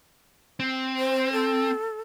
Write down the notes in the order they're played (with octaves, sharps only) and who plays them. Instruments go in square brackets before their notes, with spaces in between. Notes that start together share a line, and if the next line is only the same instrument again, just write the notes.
[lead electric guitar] C4
[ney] C5
A4